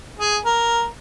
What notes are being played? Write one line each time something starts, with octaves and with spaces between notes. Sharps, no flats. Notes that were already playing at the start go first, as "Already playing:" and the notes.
G#4
A#4